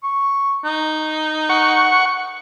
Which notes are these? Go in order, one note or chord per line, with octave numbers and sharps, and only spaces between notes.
C#6
D#4
F#5 C#6